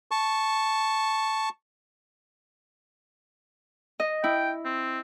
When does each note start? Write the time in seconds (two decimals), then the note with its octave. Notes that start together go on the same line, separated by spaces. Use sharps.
0.11 A5 C#6
4.00 D#5
4.24 E4 G5
4.65 C4